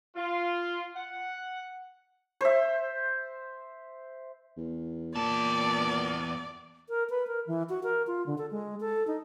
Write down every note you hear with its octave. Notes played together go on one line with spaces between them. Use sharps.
F4
F#5
C5 E5
E2
E2 A#2 D5 A5
A#4
B4
A#4
E3
F#4
A#4
F4
D3
A4
G#3
A4
D#4